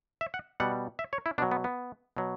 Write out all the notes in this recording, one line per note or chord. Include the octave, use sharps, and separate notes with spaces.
E5
F#5
B2 G3 F#5
E5
C#5
E4
B2 F#3 D4
B3
B3
B2 F#3